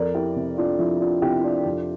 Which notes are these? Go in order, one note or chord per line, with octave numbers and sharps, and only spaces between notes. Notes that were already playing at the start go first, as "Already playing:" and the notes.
Already playing: F2 A#4 D5
E4 G4
C3
D4 F4
F3 E4
D4 F4
C3 E4 G4
E4
D4 F4
F2